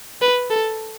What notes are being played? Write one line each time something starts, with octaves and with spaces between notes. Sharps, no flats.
B4
A4